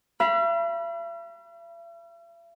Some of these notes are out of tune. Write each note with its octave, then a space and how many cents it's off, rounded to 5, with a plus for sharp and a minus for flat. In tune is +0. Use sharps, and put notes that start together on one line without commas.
E5 +45 B5 -25